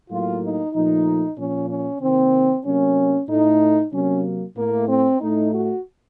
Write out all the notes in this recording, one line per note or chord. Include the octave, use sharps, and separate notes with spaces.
A2 F#3 A#3 F4
D#4
A#2 F3 A3 D#4
A#2 F3 A#3 C#4
C#4
C3 D#3 A#3 C4
C3 F#3 A#3 C#4
A2 A3 D#4
C3 F#3 A#3 C#4
A2 A3 A#3
C4
A2 A3 D#4
F#4